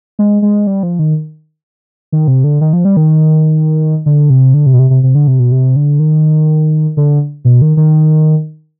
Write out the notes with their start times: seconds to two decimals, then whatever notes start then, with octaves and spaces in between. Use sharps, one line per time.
0.19 G#3
0.42 G#3
0.67 G3
0.83 F3
0.99 D#3
2.12 D#3
2.28 C3
2.44 D3
2.61 D#3
2.73 F3
2.85 G3
2.97 D#3
4.06 D3
4.30 C3
4.54 D3
4.66 C3
4.73 B2
4.79 C3
4.90 C3
5.03 C3
5.15 D3
5.27 C3
5.39 B2
5.52 C3
5.76 D3
5.99 D#3
6.97 D3
7.45 B2
7.62 D#3
7.77 D#3